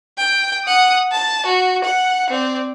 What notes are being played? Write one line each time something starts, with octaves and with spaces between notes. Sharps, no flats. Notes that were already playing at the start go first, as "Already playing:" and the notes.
G5
F#5 D#6
A5
F#4
F#5
C4 D5